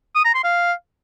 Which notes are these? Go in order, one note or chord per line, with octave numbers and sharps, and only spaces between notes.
D#6
A#5
C6
F5